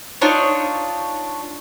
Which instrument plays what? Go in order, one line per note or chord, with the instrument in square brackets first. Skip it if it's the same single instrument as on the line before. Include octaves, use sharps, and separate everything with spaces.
[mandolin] D4 D#4 F4 C#5